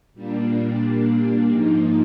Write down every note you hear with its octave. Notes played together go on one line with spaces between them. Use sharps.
A#2 G3 A#3 D4
G#2 F3 A#3 D#4